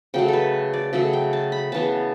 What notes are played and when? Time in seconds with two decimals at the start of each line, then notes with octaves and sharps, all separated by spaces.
0.14 C#3 F#3 A3 G5
0.28 A4 B4
0.74 D5
0.93 C#3 F#3 A3 E5
1.13 G5
1.33 A5
1.52 B5
1.72 C#3 E3 B3 A5